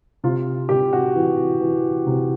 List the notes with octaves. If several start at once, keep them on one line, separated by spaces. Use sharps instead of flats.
C3 F4
C3 G4
F#4
E3
E3
C3